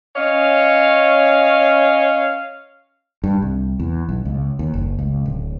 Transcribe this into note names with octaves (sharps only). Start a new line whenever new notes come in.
C#4 C#5 D#5 F5
G2
C2
E2
B1
C#2
D#2
F#1
C#2
D1